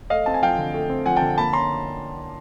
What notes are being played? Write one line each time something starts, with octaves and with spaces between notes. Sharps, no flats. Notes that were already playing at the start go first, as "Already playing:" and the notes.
A3 D#5 F5
C4 A5
G#5
F3 F5 G5
D3
A3
C4
F3 F#5 G#5
G5 A5
D3
A#3 A5 B5
C#4 A#5 C6